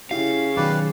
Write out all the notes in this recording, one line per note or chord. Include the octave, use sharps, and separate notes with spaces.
C#3 E4 G4 F5
B2 D#3 F#3 G4 B4 D5